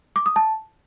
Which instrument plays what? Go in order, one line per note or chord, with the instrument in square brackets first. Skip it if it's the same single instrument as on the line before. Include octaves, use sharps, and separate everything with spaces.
[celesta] D6
D#6
A5